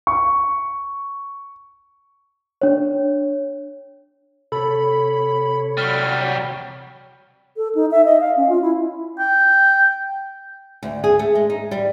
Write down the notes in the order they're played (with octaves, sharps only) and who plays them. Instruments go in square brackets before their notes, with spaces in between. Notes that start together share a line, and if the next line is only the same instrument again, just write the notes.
[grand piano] C#6
[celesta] D4 C#5
[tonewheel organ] C3 C#5 [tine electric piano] A4 [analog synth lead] B5
[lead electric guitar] F#3 G3 [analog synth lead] F6
[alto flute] A4
D#4
E5
D#5
F5
C#4
F4
E4
[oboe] G5
[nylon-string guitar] D2
G#4
A3
G#3
D#4
G3